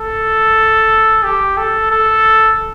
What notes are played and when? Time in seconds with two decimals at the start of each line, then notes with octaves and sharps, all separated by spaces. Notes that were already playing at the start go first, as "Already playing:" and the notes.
Already playing: A4
1.24 G4
1.57 A4
1.91 A4